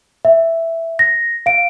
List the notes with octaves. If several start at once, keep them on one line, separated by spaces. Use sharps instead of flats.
E5
A#6
F5 D7